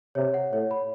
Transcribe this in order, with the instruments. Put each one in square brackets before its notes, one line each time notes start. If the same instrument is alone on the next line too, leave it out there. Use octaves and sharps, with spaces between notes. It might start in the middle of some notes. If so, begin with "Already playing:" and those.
[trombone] C3 [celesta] C#5
[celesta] F#5
[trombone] A2 [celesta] C#5
[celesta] B5